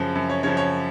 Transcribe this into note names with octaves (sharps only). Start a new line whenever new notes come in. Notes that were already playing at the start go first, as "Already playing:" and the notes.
Already playing: F#2 C#3 F3
F#2
C#5
C#3 F3 C#5
C#5